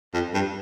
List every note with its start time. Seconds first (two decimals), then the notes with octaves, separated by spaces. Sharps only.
0.14 F2
0.34 G2